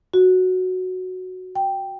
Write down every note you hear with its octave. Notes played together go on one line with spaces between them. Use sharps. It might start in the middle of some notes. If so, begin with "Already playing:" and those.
F#4
G5